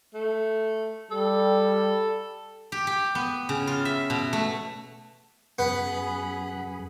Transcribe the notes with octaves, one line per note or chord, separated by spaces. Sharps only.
A3
G3 A4
G4
G4
B3
C#3
F4
E5
B2
A3
F#2 B3 G#4 B5